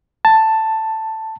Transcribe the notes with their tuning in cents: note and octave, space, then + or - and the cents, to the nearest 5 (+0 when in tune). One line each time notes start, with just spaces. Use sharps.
A5 +5